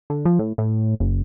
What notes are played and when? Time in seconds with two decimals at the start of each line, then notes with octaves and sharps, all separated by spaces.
0.10 D3
0.25 F3
0.39 A2
0.58 A2
1.00 F#1